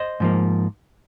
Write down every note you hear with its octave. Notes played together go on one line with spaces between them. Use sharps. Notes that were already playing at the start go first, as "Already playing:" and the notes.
Already playing: C5 D#5
G#2 F3 A#3